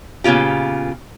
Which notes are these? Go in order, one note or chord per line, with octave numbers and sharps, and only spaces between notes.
A#2 C#3 B3 F4 G4